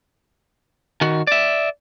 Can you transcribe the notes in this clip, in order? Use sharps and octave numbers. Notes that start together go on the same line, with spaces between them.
D#3 F#4
D5 E5